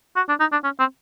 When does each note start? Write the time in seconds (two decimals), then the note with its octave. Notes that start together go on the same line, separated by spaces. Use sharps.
0.16 F#4
0.29 D4
0.40 D#4
0.52 D4
0.64 C#4
0.79 C4